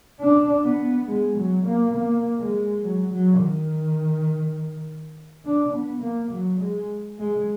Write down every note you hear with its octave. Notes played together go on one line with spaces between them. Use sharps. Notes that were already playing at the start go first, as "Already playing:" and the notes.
D4
B3
G#3
F#3
A#3
A#3
G#3
F#3
F#3
D#3
D4
B3
A#3
F#3
G#3
G#3